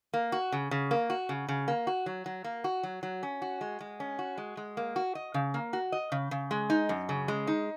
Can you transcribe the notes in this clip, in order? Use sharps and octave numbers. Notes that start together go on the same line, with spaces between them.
A#3
F#4
C#3
C#3
A#3
F#4
C#3
C#3
A#3
F#4
F#3
F#3
A#3
F#4
F#3
F#3
C#4
F#4
G#3
G#3
C#4
F#4
G#3
G#3
A#3
F#4
D#5
C#3
A#3
F#4
D#5
C#3
C#3
G#3
D#4
F#2
C#3
G#3
D#4